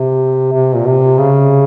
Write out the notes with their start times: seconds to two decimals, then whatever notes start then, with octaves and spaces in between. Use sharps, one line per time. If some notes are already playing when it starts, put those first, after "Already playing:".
Already playing: C3
0.52 C3
0.75 A#2
0.85 C3
1.18 C#3